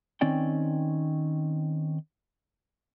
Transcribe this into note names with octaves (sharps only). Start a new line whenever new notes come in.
D#3 C4 C#4 D5 G5